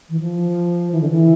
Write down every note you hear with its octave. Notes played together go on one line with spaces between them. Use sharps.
E3
F3
E3
D3
E3